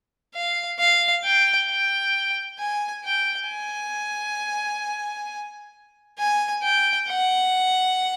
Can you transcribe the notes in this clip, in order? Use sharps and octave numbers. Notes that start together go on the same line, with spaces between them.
F5
F5
G5
G5
G#5
G5
G#5
G#5
G5
F#5